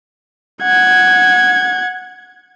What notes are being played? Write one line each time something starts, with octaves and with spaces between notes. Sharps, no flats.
F#5 G#6